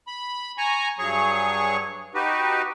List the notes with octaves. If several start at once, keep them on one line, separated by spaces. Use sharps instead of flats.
B5
G#5 A#5 C#6
G2 F#3 G#4 C#5 C#6
D#4 F#4 G4 B4